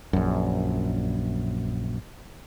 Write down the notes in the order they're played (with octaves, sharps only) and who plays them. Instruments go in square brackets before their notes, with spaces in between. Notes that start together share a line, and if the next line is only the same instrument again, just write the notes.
[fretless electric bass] A#1 F#2